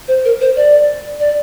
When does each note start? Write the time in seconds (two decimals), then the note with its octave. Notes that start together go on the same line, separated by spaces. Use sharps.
0.08 C5
0.25 A#4
0.41 C5
0.56 D5
1.19 D5